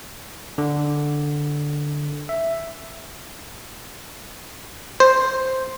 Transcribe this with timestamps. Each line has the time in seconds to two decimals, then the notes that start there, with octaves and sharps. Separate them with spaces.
0.58 D3
2.29 E5
5.00 C5